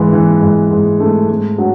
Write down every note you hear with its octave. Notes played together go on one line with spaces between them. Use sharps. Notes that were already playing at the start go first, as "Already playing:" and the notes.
Already playing: G#2 E3 B4
E3
G#2
G#2
A3
A3
F#3